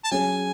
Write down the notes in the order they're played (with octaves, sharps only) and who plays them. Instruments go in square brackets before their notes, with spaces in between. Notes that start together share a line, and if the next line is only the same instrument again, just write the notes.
[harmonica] A5
[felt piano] F#3 C#4 G#4 [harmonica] G#5